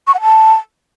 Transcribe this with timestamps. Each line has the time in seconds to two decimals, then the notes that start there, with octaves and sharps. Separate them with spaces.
0.07 C#6
0.14 F#5
0.21 A5